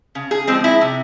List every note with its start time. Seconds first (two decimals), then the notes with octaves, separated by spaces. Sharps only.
0.15 C#3
0.31 G#4
0.47 F3 G#3 C4
0.64 E4
0.81 C3